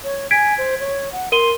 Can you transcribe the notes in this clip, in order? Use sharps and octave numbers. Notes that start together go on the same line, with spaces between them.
C#5
G#5 G#6 B6 D7
C5
C#5
F#5
A#4 C6 D#7 G7